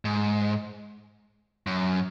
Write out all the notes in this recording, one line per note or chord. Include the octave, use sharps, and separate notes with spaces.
G#2
F#2